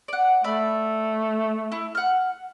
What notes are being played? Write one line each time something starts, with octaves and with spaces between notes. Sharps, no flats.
D5 F#5
A3 D5 E5 B5
E4
F#5 F6